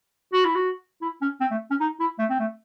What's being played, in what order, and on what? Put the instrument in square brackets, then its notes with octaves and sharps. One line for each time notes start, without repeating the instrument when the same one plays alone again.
[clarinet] F#4
E4
F#4
E4
C#4
C4
A3
C#4
D#4
E4
A3
C4
A3